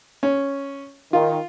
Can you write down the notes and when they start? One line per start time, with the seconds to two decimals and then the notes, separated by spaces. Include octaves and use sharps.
0.23 C#4
1.13 D#3 F4